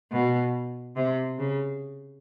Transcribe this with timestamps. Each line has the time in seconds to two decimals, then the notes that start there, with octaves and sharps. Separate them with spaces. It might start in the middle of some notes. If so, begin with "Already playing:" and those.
0.12 B2
0.97 C3
1.39 C#3